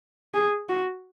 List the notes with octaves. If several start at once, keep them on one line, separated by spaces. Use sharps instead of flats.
G#4
F#4